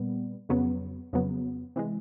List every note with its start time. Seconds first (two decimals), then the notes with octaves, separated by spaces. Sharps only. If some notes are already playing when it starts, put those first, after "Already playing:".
Already playing: A#2 G3 B3
0.49 F2 C#3 F#3 B3
1.13 F2 C#3 F#3 B3
1.76 C3 E3 G#3